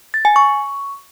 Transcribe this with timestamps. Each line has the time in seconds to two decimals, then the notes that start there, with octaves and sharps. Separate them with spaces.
0.14 A6
0.25 G#5
0.36 C#6